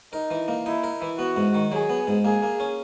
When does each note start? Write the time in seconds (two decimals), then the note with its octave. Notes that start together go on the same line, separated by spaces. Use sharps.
0.13 D#4 A#4
0.31 E3
0.48 A#3
0.66 D#4 E4
0.84 A#4
1.02 E3
1.18 B3 F#4
1.36 G#2
1.54 D#3
1.71 F#3 G#4
1.90 B3
2.07 G#2
2.24 A#3 G#4
2.43 A#3
2.60 C#4